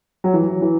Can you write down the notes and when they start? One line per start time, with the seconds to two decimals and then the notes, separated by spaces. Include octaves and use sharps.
0.24 F#3
0.34 E3
0.41 F#3
0.62 E3